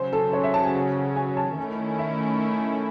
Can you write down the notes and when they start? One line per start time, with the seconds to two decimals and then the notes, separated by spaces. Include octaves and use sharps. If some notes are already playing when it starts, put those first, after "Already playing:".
Already playing: C#3 F#3 C#4 C5
0.13 A4
0.33 C#5
0.43 E5
0.54 A5
0.64 G#5
1.16 G#5
1.37 A5
1.58 D#3 A3 C#4 E4
1.99 E5